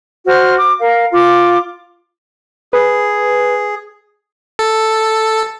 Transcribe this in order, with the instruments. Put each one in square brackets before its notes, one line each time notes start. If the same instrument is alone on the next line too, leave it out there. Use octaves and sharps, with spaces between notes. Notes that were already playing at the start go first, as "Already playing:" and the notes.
[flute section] F#4 C5 F6
D6
A#4 F5
F4 D6
[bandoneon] G#4 [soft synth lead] B4
[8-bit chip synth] A4